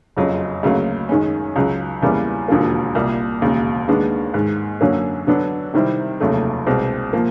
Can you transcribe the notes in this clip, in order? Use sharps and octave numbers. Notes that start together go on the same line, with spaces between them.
F#1 F2 C#3 F#3
D2 C#3 F#3 A#3
F#2 D#3 G#3 C#4
C#2 C#3 F#3
E2 C#3 E3 G3 A#3
E1 D#2 D3 F3 A#3
C2 A#2 G3 A#3
E1 D#2 C#3
D#2 D#3 G#3 B3 D4
G#2 D#3 G#3
F#2 D3 F#3 A#3 C#4
D3 F#3 B3 D4
C3 D#3 G3 C4 E4
F1 D#2 C#3 F#3 A3
C2 B2 G#3 C4
A#2 F3 A#3